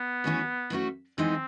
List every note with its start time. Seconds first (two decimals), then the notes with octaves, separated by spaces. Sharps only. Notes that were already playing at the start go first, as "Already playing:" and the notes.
Already playing: B3
0.24 E3 A3 C#4 F#4
0.70 E3 A3 C#4 F#4
1.18 E3 G#3 B3 C4 D#4